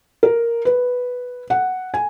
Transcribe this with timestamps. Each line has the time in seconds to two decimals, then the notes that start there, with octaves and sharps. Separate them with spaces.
0.23 A#4
0.65 B4
1.50 F#5
1.94 G#5